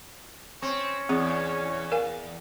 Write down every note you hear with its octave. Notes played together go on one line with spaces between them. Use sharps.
C4 C#4 C#5
E2 C4 G#4
A#4 F5 G#5